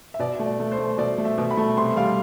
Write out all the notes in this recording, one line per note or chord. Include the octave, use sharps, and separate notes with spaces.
E5
B2 D5
A3
D5
A3
C5
A3
B2 D5
A3
E5
B2
B5
A3
C3 C6
G3 F5